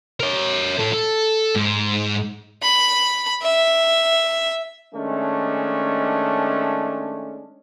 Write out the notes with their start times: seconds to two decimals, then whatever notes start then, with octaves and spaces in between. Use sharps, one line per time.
0.20 A#4 C#5
0.79 A2 A4
0.93 A4
1.55 G#2
2.62 B5
3.42 E5
4.95 D#3 G#3 A3 C#4 D4